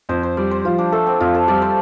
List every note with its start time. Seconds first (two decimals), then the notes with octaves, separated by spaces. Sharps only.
0.09 F2 C5
0.23 C5
0.37 G3 D5
0.51 C5
0.65 F3 F4
0.78 D4
0.92 A3 A4
1.07 C4
1.20 F2 F4
1.34 A4
1.48 G3 D5
1.62 C5